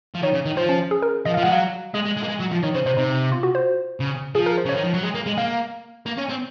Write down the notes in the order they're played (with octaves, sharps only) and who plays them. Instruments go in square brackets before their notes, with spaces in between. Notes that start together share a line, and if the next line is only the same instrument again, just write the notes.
[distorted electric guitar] F3
[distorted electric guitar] D#3 [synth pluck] C#5
[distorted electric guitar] C#3
D#3
[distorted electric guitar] F3 [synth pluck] C5
[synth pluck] C#4
G#4
A#4
[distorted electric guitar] F3 [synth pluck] D#5
[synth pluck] F5
[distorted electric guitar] F3
[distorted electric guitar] G#3 [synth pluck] F#5
[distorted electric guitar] F#3 [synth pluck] F5
[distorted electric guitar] G#3 [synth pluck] D#5
[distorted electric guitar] G#3
G#3
A#3
G#3
F#3
F3
[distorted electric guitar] D#3 [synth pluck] C#5
[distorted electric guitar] C#3 [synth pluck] C5
[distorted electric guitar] C3 [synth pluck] C5
[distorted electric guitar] C3 [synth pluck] D#4
[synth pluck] F4
F#4
C5
[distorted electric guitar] C#3
[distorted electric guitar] F3 [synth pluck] G#4
[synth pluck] A#4
C5
[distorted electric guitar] C#3 [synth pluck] C#5
[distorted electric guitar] D#3
F3
F#3
G#3
A#3
G#3
[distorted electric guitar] A#3 [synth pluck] F5
[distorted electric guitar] A#3
C#4
C4